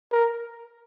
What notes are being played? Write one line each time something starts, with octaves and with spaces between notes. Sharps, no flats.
A#4